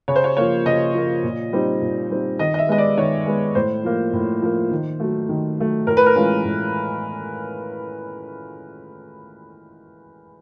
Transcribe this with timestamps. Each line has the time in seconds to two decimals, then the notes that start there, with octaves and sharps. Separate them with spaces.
0.08 C#3 C#5
0.16 C5
0.24 C#5
0.37 F3 A#3 C#5
0.66 C#3 D#5
0.94 F3 A#3
1.24 A#2
1.53 G3 C4 D#4
1.82 A#2
2.11 G3 C4 D#4
2.39 D#3 D#5
2.54 D#5
2.59 E5
2.68 G#3 B3 D#5
2.78 D5
2.97 D#3 C#5
3.26 G#3 B3
3.55 A2 C5
3.84 F3 A#3
4.13 A2
4.42 F3 A#3
4.71 D#3
5.00 F#3 A3
5.29 D#3
5.58 F#3 A3
5.87 A2 A#4
5.97 B4
6.06 A#4
6.16 E3 G#3 C#4 F4
6.44 A2